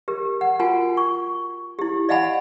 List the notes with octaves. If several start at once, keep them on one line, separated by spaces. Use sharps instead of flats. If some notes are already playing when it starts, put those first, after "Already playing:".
G4 A#4
F#5
F4 F#4 A#4 G5 G#5
C#6
E4 G4
D5 D#5 F5 F#5 G#5 B5